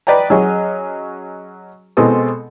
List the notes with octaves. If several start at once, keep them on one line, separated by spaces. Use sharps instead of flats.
B4 D5 D#5 G5 A#5
F#3 C#4 F#4 G#4 D#5
B2 G#3 C4 A4 D#6